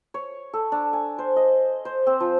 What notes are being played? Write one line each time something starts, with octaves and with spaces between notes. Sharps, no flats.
C#5
A4
D4
G#5
C5
D#5
C5
C4
F3